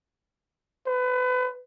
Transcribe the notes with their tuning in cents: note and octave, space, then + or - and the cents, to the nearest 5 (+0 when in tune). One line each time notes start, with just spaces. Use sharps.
B4 +30